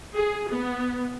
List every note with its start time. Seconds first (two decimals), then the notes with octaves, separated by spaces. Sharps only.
0.15 G#4
0.49 B3